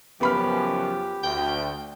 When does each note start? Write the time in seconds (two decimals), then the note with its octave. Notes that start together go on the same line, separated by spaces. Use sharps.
0.21 F#2 C#3 F3 B3 G4 B5 F6
1.23 D2 G5